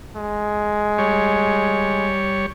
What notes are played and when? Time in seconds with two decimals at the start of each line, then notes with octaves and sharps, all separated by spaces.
0.17 G#3
0.98 G3 C#5